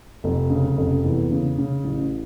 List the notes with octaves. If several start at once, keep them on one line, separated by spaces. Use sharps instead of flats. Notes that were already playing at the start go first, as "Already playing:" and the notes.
F1
C#3
F1
E2
C#3
C#3
A1